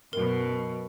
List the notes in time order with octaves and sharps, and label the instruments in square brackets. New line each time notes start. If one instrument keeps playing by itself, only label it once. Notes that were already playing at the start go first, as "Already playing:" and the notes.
[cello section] F#2 B2 [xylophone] A#4